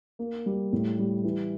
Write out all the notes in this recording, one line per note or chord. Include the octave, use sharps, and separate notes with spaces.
A#3
G3
A2
G3
E3